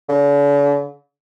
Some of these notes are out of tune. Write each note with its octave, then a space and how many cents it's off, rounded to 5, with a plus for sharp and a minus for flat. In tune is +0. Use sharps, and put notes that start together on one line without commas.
D3 -45